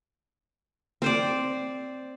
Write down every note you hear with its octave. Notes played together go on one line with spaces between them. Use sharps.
C4 C5 D5